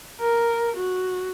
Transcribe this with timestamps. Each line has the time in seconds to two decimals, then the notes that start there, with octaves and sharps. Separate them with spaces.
0.21 A#4
0.77 F#4